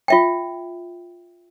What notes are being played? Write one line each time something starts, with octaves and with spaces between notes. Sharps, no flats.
F4 E5 G5